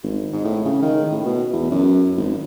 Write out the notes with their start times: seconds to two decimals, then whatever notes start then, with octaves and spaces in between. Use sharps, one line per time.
0.03 G#1
0.33 G#2
0.45 A2
0.65 C#3
0.82 D#3
1.11 A2
1.25 B2
1.53 E2
1.71 F#2
2.17 G#1